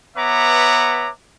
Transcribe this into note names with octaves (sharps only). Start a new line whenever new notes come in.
B3 B4 C#5 E5 A#5 D6